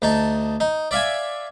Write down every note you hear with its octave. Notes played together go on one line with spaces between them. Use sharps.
D2 D#4 A5
D#4
D5 E5 F5 G#5